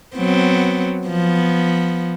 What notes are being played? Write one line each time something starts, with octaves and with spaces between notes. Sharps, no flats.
F#3 B3 C4
F3 B3